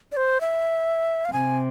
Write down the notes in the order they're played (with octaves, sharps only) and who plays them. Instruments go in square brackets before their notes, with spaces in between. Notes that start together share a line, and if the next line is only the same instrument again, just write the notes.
[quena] D5
C5
E5
F5
[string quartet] C3 [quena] G#5